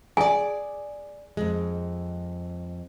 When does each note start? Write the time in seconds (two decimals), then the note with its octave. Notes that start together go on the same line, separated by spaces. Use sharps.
0.17 G#4 D5 G#5
1.37 F2 G#3